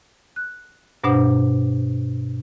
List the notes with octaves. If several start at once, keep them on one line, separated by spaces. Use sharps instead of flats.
F#6
G2 B2 D4 C5 F#5